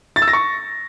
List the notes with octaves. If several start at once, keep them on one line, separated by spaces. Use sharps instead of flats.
A6
E6
A#6
C#6